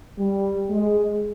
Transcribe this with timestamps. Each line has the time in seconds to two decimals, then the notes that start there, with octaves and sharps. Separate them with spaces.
0.19 G3
0.71 G#3